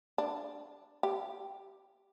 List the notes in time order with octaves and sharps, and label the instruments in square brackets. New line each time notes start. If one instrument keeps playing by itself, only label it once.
[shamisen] D4
G4